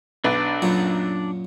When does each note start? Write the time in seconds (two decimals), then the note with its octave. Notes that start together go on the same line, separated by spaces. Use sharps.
0.24 B1 D4 B4 D5
0.62 F#2 A#2 F#3